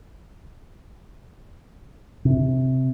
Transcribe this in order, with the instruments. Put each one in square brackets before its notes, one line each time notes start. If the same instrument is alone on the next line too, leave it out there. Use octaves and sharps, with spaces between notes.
[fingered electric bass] C3